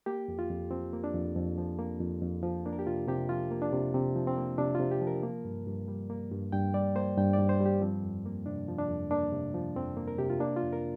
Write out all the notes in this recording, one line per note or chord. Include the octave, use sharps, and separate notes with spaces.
A#3 G4
F2
F4
F2
F3 C4
A#3
D4
F2
F2
F3
A#3
F2
F2
F3
A#3 D4
A#4
G4
C3 F4
C3 G4
F3 F4
A#3
D4
C3
C3 C4
F3
C4
A#3
C3 D4
F4
C3
G4
F3
A#4
A#3
G2
G2
G3
A#3
G2
G2 G5
G3 D5
A#3 C5
G2 G5
D5
G2
C5
G3
G4
F3 C4
F2
A#3
C3 D4
F3
D4
F2
A#3 D4
C3
F3
F2 C4
A#3
A#4
C3 G4
F4
A#3 D4
F4
F2
A#4